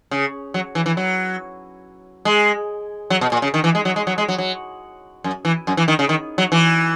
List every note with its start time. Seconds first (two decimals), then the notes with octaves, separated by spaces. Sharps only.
0.11 C#3
0.54 F#3
0.75 E3
0.86 E3
0.97 F#3
2.25 G#3
3.10 F#3
3.21 B2
3.32 A#2
3.42 C#3
3.54 D#3
3.64 E3
3.75 G#3
3.85 F#3
3.96 G#3
4.07 F#3
4.18 G#3
4.28 F#3
4.38 F#3
5.24 F#2
5.45 E3
5.67 F#2
5.77 E3
5.88 D#3
5.99 C#3
6.09 D#3
6.38 F#3
6.52 E3